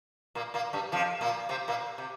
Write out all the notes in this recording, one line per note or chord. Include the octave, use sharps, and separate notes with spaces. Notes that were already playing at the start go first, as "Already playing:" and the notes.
A#2 A#3
A#2 A#3
G2 G3
F2 F3
A#2 A#3
C3 C4
A#2 A#3
C3